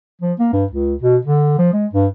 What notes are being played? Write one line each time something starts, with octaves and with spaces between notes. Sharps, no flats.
F3
A#3
G2
C#2
B2
D3
F3
G#3
G2